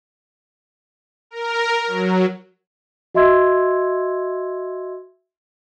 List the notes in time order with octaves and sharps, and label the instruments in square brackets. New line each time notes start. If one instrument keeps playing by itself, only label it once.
[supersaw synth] A#4
F#3
[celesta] F#4 D#5 E5 C6 E6 G#6